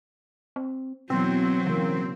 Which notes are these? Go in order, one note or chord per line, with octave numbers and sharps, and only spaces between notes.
C4
B2 E3 F#3 B3 C4
C#3 E3 A#3